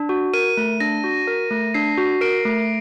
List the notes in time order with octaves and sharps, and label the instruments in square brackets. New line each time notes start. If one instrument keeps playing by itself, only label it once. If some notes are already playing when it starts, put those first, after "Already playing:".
Already playing: [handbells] D4
F#4
[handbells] A#4 [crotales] D#7
[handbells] A3
[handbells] D4 [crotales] A#6
[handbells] F#4
A#4
A3
[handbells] D4 [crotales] C7
[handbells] F#4
[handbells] A#4 [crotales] D7
[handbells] A3